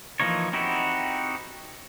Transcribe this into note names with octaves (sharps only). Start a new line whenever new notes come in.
E3 F3 A#3 D#4 C#5
C4 D#4 E4 F#4 G4